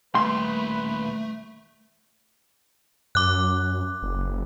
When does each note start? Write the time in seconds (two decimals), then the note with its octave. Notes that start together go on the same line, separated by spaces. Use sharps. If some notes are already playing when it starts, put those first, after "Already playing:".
0.15 D#2 G3 A3 B4 C6
3.15 F#2 D6 F#6
4.03 F#1